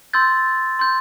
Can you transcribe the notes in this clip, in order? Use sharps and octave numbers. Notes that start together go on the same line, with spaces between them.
C6 E6 G6 A6
C6 G6